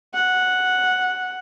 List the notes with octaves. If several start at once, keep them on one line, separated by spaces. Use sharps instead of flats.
F#5